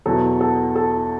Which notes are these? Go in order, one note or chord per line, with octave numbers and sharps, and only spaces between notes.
E2 B2 F#3 A4
A4
A4